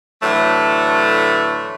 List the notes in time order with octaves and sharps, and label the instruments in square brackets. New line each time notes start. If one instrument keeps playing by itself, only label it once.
[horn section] A2 D3 E3 F#3 A3